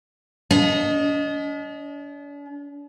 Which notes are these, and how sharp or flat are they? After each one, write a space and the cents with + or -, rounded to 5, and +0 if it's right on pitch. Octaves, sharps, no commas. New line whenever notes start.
D4 -45 D#5 +0